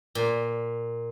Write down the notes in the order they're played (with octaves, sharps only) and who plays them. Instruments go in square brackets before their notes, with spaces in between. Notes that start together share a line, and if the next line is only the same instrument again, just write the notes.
[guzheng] A#2